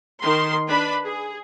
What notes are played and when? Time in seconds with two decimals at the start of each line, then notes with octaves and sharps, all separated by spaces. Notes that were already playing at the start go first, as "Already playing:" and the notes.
0.23 D#3 C6
0.68 D4 B4 B5
1.05 G#4